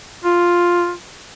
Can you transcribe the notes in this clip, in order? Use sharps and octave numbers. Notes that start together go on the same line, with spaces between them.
F4